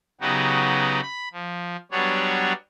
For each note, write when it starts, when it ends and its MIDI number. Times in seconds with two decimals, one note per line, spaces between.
0.21 1.01 49
0.21 1.01 54
0.21 1.01 59
0.21 1.01 63
0.21 1.01 66
0.21 1.01 67
1.02 1.28 83
1.33 1.77 53
1.92 2.53 54
1.92 2.53 55
1.92 2.53 59
1.92 2.53 62
1.92 2.53 73